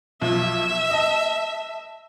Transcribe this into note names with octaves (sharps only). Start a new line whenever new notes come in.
B1 F3 E5
D#5 A5